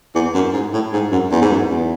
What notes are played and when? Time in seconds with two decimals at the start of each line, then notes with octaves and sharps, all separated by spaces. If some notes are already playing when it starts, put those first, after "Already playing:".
0.15 E2
0.34 F#2
0.53 G#2
0.73 A2
0.92 G#2
1.12 F#2
1.31 E2
1.42 G#2
1.51 F#2
1.69 E2